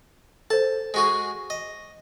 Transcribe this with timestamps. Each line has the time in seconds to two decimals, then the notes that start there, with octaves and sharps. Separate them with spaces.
0.50 A4 C5 A5
0.94 G#3 F#4 G#4
1.50 D#5